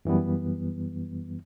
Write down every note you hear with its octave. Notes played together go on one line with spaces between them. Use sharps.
F#2 E3 G3 B3